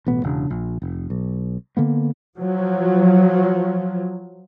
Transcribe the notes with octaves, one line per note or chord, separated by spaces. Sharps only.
A1 B2 B3
E1 C#3 D4
A#1
F1
B1
D3 A#3 B3
F3 F#3